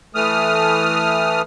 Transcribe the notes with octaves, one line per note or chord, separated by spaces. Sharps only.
E3 A3 D#6 F6